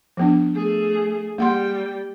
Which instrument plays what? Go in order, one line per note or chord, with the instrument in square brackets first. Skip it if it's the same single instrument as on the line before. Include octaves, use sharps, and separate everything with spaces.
[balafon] F3 B3 D4
[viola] A3 G#4
[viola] G3 G5 [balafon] A#3 F#5 C6